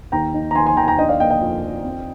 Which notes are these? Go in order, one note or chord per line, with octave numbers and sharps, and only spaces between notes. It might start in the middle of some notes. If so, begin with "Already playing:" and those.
D#2 G5 A#5
D#4
A#5
D#3 G#5 C6
G#5 C6
D#2 G5 A#5
G#5
G5 A#5
D4 D#5 G5
D5 F5
A#3 D#5 G5
D#5 G5
F2
F2
C4